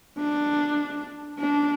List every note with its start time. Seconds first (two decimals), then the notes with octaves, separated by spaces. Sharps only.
0.19 D4
1.39 D4